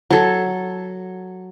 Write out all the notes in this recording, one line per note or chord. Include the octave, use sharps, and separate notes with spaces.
F#3 A4